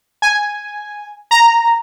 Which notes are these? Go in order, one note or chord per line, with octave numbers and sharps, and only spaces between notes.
G#5
A#5